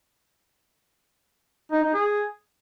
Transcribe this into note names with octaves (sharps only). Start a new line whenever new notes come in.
D#4
D#4
G#4